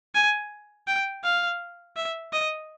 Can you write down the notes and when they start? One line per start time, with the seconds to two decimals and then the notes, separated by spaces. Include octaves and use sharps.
0.15 G#5
0.87 G5
1.24 F5
1.96 E5
2.33 D#5